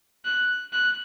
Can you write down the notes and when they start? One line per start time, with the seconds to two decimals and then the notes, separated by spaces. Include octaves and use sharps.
0.25 F#6
0.72 F#6